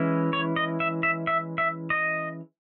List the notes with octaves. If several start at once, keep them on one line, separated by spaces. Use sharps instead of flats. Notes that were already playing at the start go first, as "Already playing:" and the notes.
Already playing: E3 G#3 C#4 E4
C#5
D#5
E5
E5
E5
E5
D#5